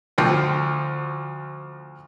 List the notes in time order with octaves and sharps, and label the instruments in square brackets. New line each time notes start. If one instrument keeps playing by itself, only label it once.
[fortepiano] D2 F3 G5